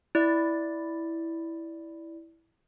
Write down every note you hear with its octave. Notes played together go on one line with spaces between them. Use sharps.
E4 D5